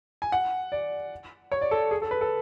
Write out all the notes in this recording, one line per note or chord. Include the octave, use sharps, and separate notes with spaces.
G#5
F#5
D5
C#5
D5
A4
G#4
A4
B4
A4